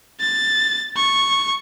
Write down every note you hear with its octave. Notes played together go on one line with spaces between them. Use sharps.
A6
C#6